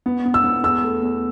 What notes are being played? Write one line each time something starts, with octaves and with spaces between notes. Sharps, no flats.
B3
B3
E6
B3
E2 E6
A3
E2